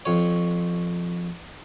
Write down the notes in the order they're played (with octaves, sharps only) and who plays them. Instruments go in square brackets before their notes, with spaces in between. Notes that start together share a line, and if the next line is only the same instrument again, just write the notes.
[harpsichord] F2 C#5